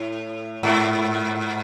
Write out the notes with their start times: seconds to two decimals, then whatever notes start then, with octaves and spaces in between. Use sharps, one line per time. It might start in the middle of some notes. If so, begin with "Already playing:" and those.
Already playing: A2
0.63 G#2